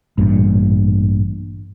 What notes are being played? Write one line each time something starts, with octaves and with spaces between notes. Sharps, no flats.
A1 G2 A#2